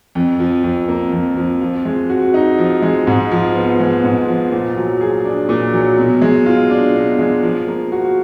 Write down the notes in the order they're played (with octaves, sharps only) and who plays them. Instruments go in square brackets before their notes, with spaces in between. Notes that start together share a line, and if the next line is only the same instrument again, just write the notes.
[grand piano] F2
F3
F2
A#3
F2
F3
F3
G#3
F#4
D#4
F3
G#3
G#2
F3
B3
G#3
G#2
F3
A#2
F#3
G#4
D4
A#2
F#3
B2
G#3
F4
D4
B2
G#3
F3
A#3
F#4